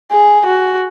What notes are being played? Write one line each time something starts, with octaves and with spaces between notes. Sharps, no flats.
G#4
F#4